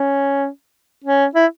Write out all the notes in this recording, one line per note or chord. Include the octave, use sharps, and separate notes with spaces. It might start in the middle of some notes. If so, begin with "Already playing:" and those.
Already playing: C#4
C#4
E4